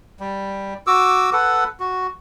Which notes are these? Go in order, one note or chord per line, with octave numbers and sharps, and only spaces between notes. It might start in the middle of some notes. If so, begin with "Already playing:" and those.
G3
F#4 D6 E6
A4 B4 F#5
F#4